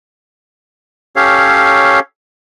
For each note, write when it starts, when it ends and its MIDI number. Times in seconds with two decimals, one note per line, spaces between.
1.16 2.00 61
1.16 2.00 67
1.16 2.00 69
1.16 2.00 73
1.16 2.00 77